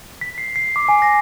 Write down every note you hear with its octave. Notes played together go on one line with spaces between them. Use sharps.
B6
C7
C7
D6
G#5
A#6